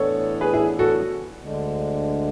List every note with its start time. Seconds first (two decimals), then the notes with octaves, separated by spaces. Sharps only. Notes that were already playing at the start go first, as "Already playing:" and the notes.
Already playing: A2 E3 B3 D4 A4 C#5
0.41 G#4 B4
0.54 E4 G#4
0.79 F#4 A4
1.42 D2 D3 G#3 D4